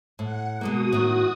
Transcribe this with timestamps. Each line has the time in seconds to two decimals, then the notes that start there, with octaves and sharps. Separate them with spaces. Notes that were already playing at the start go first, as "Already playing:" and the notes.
0.19 A2 F#5
0.61 B2 G#3 A#3 F#4 D#6
0.92 A2 D#3